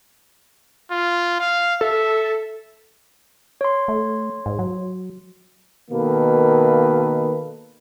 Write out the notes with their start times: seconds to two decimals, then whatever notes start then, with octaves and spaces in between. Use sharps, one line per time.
0.91 F4
1.40 F5
1.81 A4 E5
3.61 C#5 C6
3.88 A3
4.46 G#2
4.59 F#3
5.91 B2 D#3 A#3 A4 B4